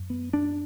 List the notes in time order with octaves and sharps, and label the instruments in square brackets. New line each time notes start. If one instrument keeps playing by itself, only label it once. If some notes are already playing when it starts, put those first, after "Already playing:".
Already playing: [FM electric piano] F#2
[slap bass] B3
D4